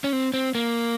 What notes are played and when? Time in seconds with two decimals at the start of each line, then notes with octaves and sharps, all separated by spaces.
0.04 C#4
0.13 C4
0.34 C4
0.55 A#3